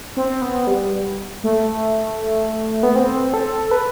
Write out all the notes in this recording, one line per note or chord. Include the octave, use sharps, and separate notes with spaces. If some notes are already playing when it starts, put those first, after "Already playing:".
C4
B3
G3
A3
B3
C4
A4
B4